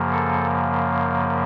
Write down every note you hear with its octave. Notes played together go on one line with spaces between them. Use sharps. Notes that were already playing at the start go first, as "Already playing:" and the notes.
Already playing: F#2 C#3 F3 A#3
A4